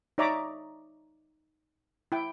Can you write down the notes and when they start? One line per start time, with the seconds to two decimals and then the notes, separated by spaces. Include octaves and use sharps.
0.18 D#4 C#5 D5 E5 A#5 D6
2.12 E4 G5